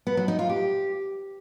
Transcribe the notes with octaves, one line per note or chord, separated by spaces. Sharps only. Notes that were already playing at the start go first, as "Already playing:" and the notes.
B3
F#3
D#4
F4
G4